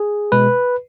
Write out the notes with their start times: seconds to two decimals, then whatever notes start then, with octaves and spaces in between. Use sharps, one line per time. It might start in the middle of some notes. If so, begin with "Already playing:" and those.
Already playing: G#4
0.32 B2 G#3 B4